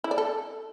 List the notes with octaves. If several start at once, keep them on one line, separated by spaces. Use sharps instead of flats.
E4
D5
A4